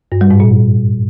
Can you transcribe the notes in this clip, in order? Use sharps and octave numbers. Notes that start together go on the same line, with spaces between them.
G2
G3
G#2
A#2